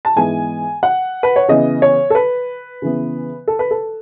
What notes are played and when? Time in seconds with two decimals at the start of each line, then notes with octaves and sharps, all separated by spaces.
0.05 A5
0.16 G#2 E3 G#3 B3 G#5
0.83 F#5
1.23 B4
1.36 C#5
1.48 C#3 E3 B3 D#5
1.82 C#5
2.10 A4
2.15 B4
2.82 C#3 E3 B3
3.48 A4
3.59 B4
3.71 A4